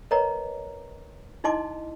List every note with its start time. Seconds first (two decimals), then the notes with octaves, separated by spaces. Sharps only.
0.11 A#4 B4 C#5 D#5 A#5
1.44 D#4 E4 D#5 A5 C6 D6